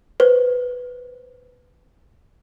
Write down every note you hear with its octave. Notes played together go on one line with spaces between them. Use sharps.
B4 C5